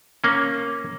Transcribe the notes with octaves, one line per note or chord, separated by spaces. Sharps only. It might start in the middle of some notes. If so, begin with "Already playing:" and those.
A#3 C#4